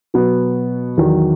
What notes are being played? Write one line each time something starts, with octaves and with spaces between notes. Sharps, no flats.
B2 F#3 B3
E2 D#3 F#3